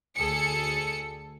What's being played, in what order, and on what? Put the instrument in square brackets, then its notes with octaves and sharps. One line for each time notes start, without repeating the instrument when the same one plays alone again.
[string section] D2 G#4 A4 C#7